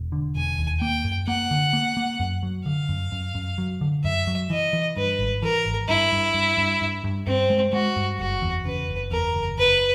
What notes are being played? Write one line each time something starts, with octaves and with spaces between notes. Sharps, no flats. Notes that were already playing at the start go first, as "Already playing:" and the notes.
Already playing: E1
D3
E1 G#5
D#2
A#3 G5
F#2
A#3 F#5
D3
A#3
A#3
F#2
F#3
D3 F5
F#2
F#2
F#2
F#3
D3
F#2 E5
F#3
E3 D#5
E3
G2 B4
G#1
E3 A#4
G#1
G2 E4
G2
G2
G2
G2
G2
G2 C4
G#3
G#3 F#4
G2
F#1 F#4
E2
C#3 B4
F#1
E2 A#4
F#1
F#1 B4